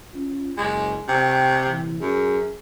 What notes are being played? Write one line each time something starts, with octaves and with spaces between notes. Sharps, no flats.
C#4 F4
F#1 G#3
C3 G5
C2 A#2 E3
F#2 G#4